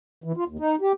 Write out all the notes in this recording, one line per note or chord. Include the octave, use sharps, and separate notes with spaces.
E3
F4
D#2
D#4
G4